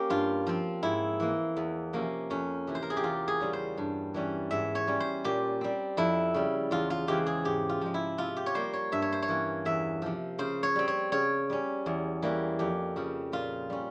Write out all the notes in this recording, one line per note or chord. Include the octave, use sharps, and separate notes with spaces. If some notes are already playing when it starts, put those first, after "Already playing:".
Already playing: A#3 C#4 G4
G2 F4
F3 C4
G#2 E4
E3 A#3
E2
C3 F3 A#3 C#4
F2 C#4
C3 E3
C5
A#4
G#4
G4
E2 F4
G#4
C#3 G3 C#4
C5
G2
E3 G3 C#4
G#2 E5
C#5
G3 C#4
C5
A#2 G4
G3 C4
F2 E4
C#3 G3
E2 F4
F4
C#3 E3 G#3 C4 G4
G#4
G#2 G4
F4
F3 G#3
E4
C3 F4
G4
C#5
G3 A#3 C5
C#5
G2 E5
C#5
C5
C#5
E3 A#3 C#4
E2 E5
C3 F3
C#3 C5
C#5
G3 C4
C#5
C#3 C#5
G3 C#4
E2
E3 G3 A#3 C#4
F2 G4
C#3 F3
A#2 F4
G3 C#4